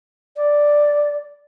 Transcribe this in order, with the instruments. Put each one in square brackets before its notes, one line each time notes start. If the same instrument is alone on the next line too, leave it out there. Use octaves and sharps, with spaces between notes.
[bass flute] D5